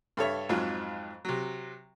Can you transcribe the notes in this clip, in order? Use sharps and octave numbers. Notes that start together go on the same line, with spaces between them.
G2 A4 C#5 E5
F2 G#2 F#3 F4
C3 F#3